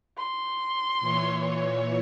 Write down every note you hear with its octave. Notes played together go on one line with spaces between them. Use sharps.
C6
A#2 E3 C#5